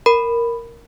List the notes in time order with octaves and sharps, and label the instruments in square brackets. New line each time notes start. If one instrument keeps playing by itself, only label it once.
[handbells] A#4 B5